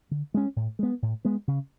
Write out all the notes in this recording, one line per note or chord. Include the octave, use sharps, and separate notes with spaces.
D3
G#3 C#4
A2
G#3 B3
A2
G#3 B3
C#3